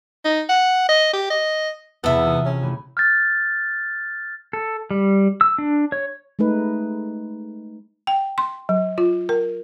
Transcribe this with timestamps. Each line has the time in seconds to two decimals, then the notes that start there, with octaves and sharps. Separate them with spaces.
0.25 D#4
0.49 F#5
0.89 D#5
1.13 G4
1.30 D#5
2.04 E2 C3 B3 A4 E5
2.25 F4 D#6 E7
2.45 C#4
2.63 E3 A3 E4
2.97 F6 G6 A6
4.53 A4
4.91 G3
5.41 E6
5.58 D4
5.92 C#5
6.39 G#3 A3 D#4 B4
8.07 G5
8.38 C6
8.69 F#3
8.98 F4
9.29 A#4